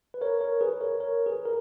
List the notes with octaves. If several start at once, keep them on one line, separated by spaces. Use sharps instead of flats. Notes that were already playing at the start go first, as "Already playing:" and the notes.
B4
A#4 C#5
A#4 C#5
G#4 B4
A#4 C#5
A#4 C#5
G#4 B4
A#4